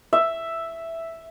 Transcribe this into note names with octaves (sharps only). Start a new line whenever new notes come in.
E5